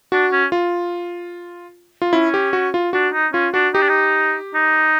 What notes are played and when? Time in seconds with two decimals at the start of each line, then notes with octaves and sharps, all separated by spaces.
0.12 D4 F#4
0.32 C#4
0.52 F4
2.02 F4
2.13 C#4 E4
2.34 G4
2.53 F#4
2.74 F4
2.93 D4 F#4
3.13 D#4
3.33 C#4 F4
3.54 D4 F#4
3.74 D#4 G4
3.81 D4
3.89 D#4
4.54 D#4